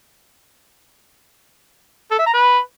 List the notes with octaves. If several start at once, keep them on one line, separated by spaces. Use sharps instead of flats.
A4
E5
A#5
B4